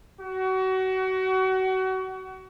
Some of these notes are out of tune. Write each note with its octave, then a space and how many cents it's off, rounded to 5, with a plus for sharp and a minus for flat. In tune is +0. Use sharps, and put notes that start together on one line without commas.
F#4 +30